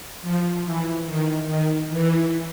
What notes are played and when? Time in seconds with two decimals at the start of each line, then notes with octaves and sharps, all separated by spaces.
0.22 F3
0.64 E3
1.06 D#3
1.47 D#3
1.89 E3